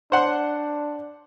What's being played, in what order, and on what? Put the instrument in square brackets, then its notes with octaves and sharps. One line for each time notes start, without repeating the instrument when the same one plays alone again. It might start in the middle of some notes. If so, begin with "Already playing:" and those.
[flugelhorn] D4 [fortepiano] C5 F#5 C6